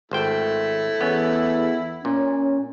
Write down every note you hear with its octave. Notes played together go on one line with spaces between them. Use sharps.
G#1 A3 E4 C5 G5
E2 B3 C#4
A#2 C#4